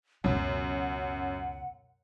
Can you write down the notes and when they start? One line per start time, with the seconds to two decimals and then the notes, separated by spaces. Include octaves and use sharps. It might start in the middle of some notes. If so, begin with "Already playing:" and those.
0.24 C#2 F#2 B2 F#5